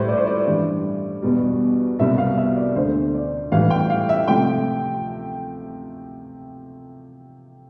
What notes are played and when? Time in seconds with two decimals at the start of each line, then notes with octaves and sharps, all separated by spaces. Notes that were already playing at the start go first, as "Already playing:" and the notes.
Already playing: A2 G3 B4 C5
0.08 D5
0.17 C5
0.27 D5
0.47 G2 E3 G3
1.22 E2 B2 G3
1.99 C2 B2 G3 E5
2.18 F5
2.38 E5
2.56 D5
2.76 D2 D3 A3 C5
3.14 D5
3.52 A2 E3 G3 F5
3.70 G5
3.90 F5
4.09 E5
4.28 C3 F3 A3 G5